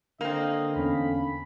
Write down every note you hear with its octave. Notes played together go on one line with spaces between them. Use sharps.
D3 A#3 C4 D#5
E2 C#4 F5 B5